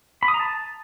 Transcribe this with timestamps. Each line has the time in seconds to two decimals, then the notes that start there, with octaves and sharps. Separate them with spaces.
0.23 B5
0.28 D#6
0.34 A#5
0.40 A5